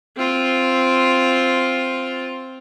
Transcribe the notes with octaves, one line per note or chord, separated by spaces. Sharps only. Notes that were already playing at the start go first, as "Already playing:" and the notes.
C4 F4